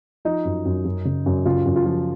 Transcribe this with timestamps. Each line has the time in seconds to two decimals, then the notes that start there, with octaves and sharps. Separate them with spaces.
0.25 F3 D#4
0.45 F#2
0.66 F#2
0.85 F#2
1.05 C#3
1.26 F#2
1.46 C#3 F4
1.66 F#2
1.76 F4
1.86 F3